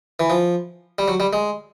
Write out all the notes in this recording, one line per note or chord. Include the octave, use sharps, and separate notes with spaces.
E3
F3
G3
F#3
G3
G#3